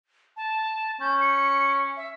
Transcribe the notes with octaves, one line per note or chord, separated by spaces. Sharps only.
A5
C#4 G6
C#7
E5